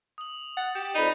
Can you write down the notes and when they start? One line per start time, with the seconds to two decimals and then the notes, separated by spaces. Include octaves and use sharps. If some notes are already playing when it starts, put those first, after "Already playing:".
0.18 D#6 F#7
0.57 F#5 A6
0.75 G4 G6 C#7 E7
0.95 F2 D#4 D5 B5